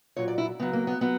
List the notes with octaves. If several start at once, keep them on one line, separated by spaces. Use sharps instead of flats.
A#2 F#3 C#5
D5
E4
C#3 F#3 B3
A#3
B3
F#3 B3